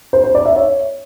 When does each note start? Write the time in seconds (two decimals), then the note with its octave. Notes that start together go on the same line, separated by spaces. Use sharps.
0.13 C5
0.24 C5
0.35 D5
0.45 E5
0.56 C#5